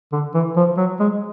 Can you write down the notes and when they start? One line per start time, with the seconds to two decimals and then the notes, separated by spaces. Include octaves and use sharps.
0.12 D3
0.34 E3
0.56 F3
0.77 F#3
1.00 G#3